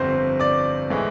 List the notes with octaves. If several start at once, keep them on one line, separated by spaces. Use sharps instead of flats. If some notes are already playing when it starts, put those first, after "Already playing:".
Already playing: G1 F2 C3 C5 C6
D5 D6
A2 E3 G#3